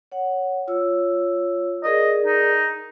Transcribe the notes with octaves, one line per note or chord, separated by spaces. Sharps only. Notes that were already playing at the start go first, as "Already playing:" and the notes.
C#5 F#5
F4 C#5 E6
G#4 A#4 D5 D#5
D#4